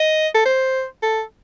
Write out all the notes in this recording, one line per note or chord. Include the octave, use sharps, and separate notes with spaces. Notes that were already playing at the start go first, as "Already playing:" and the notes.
Already playing: D#5
A4
C5
A4